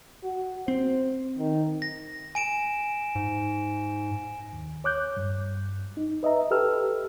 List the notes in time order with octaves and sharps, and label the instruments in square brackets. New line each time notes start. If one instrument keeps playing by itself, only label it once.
[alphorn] F#4
[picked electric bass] C4 [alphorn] C5
[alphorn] D#3
[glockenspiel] A#6
G#5 D7 E7
[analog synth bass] G#2
[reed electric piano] D#2
C#5 D6 F#6 G6
G2
D#4
B4 D#5 E5 A#5
G4 A4 B4 E6 F6